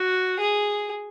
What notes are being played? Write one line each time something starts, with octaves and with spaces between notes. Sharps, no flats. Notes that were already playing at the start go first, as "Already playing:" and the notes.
Already playing: F#4
G#4